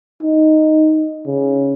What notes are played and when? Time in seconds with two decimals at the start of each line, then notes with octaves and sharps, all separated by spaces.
0.23 D#4
1.26 C#3